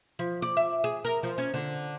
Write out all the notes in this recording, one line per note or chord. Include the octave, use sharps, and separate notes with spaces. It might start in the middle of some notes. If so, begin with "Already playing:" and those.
F3
D5
E5
G#4
A#4
F3
C#4
D3